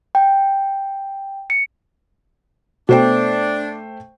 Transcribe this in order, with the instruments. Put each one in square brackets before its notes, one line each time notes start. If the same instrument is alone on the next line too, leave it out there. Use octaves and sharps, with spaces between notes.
[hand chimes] G5
C#7
[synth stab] B2 [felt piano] A3 C5 G5 [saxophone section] D4